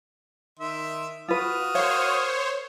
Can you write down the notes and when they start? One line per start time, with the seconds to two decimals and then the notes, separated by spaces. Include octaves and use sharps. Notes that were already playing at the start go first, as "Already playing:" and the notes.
0.59 D#3 E5 C6
1.28 F4 F#4 B4 D#6 F6
1.75 A#4 C5 C#5 F5